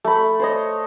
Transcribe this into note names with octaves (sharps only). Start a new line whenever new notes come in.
A3 B5
C5 C#5 D#5